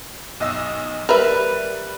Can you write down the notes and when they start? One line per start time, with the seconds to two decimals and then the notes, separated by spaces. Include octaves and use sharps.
0.40 B1 D#5 E6
1.09 G3 A#4 B4 E5